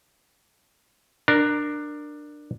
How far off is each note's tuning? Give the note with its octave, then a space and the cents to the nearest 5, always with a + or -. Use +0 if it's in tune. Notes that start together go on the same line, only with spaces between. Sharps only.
D4 +15 A#4 +0